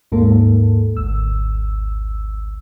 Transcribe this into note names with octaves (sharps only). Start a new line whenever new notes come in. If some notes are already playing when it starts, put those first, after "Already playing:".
D#2 G#2 A#3 A4
G#1 D2 E6